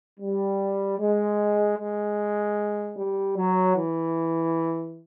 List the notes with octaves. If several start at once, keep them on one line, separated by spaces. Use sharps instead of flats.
G3
G#3
G#3
G3
F#3
E3